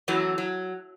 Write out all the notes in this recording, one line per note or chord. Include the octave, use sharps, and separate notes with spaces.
F#2 E3 F#3 A3
F#3